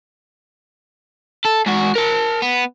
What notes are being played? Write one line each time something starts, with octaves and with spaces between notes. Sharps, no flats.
A4
G#2 F#4
A#4 A5
B3